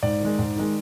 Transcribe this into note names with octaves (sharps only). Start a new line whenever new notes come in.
G#2 D5
D#3 G#3
G#2
D#3 G#3